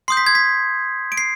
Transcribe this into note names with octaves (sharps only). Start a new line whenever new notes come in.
C6 D#6 G6 C7
B6
G#6
B6
D7
C7